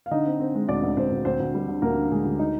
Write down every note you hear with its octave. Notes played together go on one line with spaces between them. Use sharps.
F5
D3 D#4 D#5
C4
C4
G#3
D2 D4 D5
D2
D2 C4 C5
D2
D2 C4 C5
D2
G3
D3
D2 A#3 A#4
D3
D2 G#3 G#4
D2
D#4 D#5